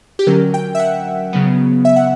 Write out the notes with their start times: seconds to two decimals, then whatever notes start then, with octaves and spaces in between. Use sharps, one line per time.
0.19 G4
0.27 D3 F#3 C#4 A#4
0.54 G5
0.75 E5
0.79 F#5
1.33 C#3 F#3 B3
1.85 E5
1.96 F#5